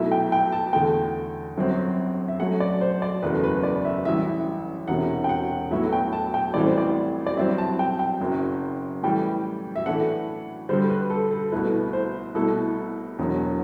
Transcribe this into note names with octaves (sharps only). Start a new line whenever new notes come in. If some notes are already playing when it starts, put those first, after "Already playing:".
Already playing: B1 B2 A3 E4 E5
G5
G5
A5
E2 D3 A3 G5
G1 F#2 F#3 C4
E5
F#2 F#3 A3 F#5
D5
C5
D5
F#1 E2 B2 A3 B4
B4
D5
E5
A1 G2 E3 E5
E1 E2 C3 F#5
G5
F#5
B1 A2 F#3 B3 E4 E5
G5
A5
G5
A1 A2 E3 G3 C4 D5
C5
D5
D5
G2 F#3 C4 E4 E5
A5
G5
G5
F#1 F#2 F#3
A2 E3 G3 G5
E5
A2 E3 A3 D4 F#5
G2 D3 G3 C5
B4
A4
A4
C2 B2 A3 E4 B4
C5
C2 B2 A3 E4 A4
E1 E2 B2 F#3